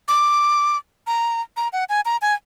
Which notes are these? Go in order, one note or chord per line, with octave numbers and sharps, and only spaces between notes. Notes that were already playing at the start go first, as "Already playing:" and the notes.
D6
A#5
A#5
F#5
G#5
A#5
G#5